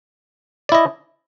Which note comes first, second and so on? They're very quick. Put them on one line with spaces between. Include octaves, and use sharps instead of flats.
D5 E4 D#5